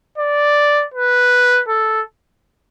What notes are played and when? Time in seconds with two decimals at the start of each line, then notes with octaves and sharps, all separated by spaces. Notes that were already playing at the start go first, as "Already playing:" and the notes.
0.18 D5
0.94 B4
1.68 A4